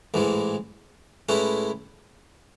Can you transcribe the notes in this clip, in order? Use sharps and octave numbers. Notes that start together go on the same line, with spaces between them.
A1 G#2 E3 G#3
A2 G#3 C#4 E4 B4